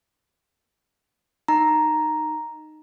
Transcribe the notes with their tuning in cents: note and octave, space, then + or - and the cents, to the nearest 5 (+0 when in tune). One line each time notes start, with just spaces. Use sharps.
D#4 -15 A#5 +5